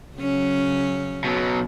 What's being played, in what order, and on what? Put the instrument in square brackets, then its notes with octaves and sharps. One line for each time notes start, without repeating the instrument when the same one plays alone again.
[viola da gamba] C#3 F#3 C#4
[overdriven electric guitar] B2 F#3